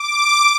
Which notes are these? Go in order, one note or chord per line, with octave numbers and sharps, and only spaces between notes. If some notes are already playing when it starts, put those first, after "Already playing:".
Already playing: D6